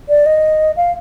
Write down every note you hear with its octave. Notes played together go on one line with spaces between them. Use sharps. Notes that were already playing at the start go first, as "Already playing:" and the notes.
D5
D#5
F5